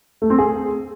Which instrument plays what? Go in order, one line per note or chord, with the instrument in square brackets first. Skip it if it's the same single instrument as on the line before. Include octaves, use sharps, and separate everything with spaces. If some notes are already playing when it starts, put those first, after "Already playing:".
[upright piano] A3
C4
G#4